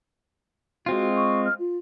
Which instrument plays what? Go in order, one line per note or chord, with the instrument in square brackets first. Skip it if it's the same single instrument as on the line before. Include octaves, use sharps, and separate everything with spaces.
[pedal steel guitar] G#3 C4 F4 [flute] F#4
[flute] C#6
F6
F4